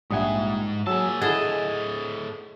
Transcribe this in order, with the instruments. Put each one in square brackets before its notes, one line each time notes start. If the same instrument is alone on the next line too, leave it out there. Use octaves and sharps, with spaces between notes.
[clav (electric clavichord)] A#1 G3 F#5 [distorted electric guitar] G#2 G#5 [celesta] E5 D#6
[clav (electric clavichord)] F#3 G#4 [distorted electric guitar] A#3 A5 [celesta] G#5 E6
[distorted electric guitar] A2 D#5 [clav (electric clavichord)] E4 A4 F#5 [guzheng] G#4 [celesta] A6 E7